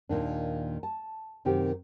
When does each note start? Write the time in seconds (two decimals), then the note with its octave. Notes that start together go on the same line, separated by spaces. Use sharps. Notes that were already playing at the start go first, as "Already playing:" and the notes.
0.09 D#2 A#2 D#3 D4
0.83 A5
1.45 F#2 C3 D#3 C4 G4